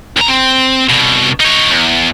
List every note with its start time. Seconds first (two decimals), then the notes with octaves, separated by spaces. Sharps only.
0.17 D#2 A#5
0.28 C4
0.89 C2 B2
1.40 D#4 C#5
1.71 E2